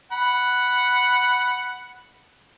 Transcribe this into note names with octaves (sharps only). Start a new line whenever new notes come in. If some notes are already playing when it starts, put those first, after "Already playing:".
F#5 B5